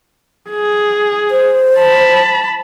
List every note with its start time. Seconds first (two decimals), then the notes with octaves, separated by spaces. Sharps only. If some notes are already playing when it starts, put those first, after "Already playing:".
0.50 G#4
1.31 C5
1.78 A5 B5